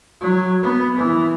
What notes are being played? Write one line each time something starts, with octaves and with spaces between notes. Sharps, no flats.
F#3
B3
E3